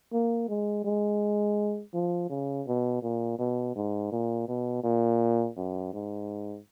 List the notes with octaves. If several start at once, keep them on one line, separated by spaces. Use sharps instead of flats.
A#3
G#3
G#3
F3
C#3
B2
A#2
B2
G#2
A#2
B2
A#2
F#2
G#2